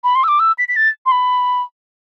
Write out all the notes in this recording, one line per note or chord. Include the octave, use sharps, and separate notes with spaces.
B5
C6
E6
D6
E6
B6
B6
A6
C6
B5